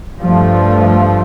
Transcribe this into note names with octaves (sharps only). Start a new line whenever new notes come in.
G2 F3 A3